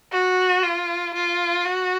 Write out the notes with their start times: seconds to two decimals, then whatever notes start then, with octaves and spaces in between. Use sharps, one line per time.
0.12 F#4
0.63 F4
1.14 F4
1.65 F#4